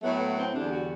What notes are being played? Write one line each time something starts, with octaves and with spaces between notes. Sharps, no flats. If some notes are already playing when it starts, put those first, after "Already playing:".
A2 F#3 A3 B3
B3
C4
E2 D3 G3 D4
F#4